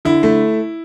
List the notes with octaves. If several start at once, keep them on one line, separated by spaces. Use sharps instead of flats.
D3 E4
A3